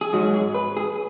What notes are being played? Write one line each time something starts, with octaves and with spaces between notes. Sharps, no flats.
G#4
G#2 F#3 F#4
G#4
B4
G#4